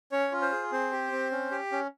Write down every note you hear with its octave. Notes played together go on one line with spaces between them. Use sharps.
C#4 C#5
F4
C5
G#4
C4 C5
G4
C4
C#4
G4
C#4